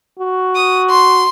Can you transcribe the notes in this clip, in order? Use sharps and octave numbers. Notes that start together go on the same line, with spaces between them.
F#4
D#6
C6